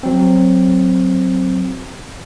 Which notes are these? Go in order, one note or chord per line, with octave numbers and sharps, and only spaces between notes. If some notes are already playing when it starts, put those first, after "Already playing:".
F#3 C4